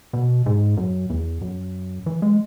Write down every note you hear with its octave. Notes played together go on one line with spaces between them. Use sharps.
B2
G#2
F#2
E2
F#2
E3
G#3